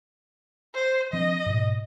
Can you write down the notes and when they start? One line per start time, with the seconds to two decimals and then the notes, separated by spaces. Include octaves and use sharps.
0.74 C5
1.13 F3 C4 D4 D#5
1.46 G#2 B2